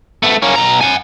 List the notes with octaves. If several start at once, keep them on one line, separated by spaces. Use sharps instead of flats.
A3 B3
A#3 C#4
B2 A#5
F#5 G#5